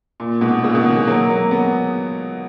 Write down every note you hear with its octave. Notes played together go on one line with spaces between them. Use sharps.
A#2
G#2 B2
A#2 C#3
B2 D#3
E3 G#3
F#3 A#3
F#3 A#3
G#3 B3